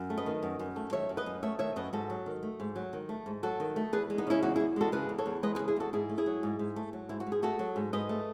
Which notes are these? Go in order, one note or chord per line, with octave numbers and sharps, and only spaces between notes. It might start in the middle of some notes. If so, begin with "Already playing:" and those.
Already playing: F#2
A3
B4 D#5
D#3
F#2
F#2
A3
D#3 C#5 E5
F#2
B4 D#5
F#2
A3 C#5 E5
D#3 C#5 E5
F#2 B4 D#5
G#2 F#4 A4
F#3
D#3
A3
G#2
F#3
D#3
A3
G#2
F#3 F#4 A4
D#3
A3
E2 G#4 B4
G#3
B3 D#4
C#3 C#4 E4
E2 D#4 F#4
E4 G#4
E2
G#3 F#4 A4
C#3 G#4 B4
E2
A4 C#5
E2
G#3 B4 D#5
G#4 B4
C#3
E4 G#4
E2 F#4 A4
G#2 E4 G#4
A3
E4 G#4
F#3
G#2
G#2
A3
F#3
G#2 E4
F#4
G#2
G#4
A3 F#4 A4
F#3
G#2
G#2 B4 D#5
A3